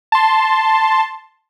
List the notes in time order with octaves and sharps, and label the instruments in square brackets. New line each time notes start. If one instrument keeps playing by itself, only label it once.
[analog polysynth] A5 C6